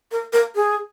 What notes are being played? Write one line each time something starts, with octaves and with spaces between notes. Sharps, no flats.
A#4
A#4
G#4